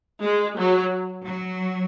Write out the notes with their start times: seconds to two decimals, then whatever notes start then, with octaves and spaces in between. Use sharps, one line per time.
0.23 G#3
0.58 F#3
1.25 F#3